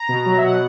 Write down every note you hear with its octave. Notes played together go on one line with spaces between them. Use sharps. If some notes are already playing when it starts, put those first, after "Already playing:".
Already playing: A#5
B2
F#3
E5
B2 F#5